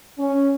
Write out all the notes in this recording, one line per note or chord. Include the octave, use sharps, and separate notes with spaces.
C#4